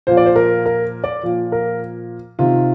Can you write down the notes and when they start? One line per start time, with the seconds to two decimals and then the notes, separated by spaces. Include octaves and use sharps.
0.07 A#2 F3 C5
0.17 D5
0.26 C5
0.36 A#4
0.66 A#4
1.04 D5
1.23 A#2 F3
1.52 A#4
2.39 C3 D#3 F4